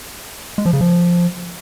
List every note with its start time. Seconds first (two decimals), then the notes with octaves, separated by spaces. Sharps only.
0.58 G#3
0.66 F3
0.73 C#3
0.81 F3